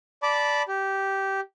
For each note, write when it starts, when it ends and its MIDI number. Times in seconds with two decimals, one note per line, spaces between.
0.23 0.63 74
0.23 0.63 81
0.23 0.63 83
0.23 0.63 86
0.68 1.40 67